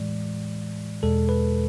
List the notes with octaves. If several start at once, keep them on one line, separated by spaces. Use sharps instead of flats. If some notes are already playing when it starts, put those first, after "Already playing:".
Already playing: A2 E3 G#3 D5
E2 B2 G#3 A4
B4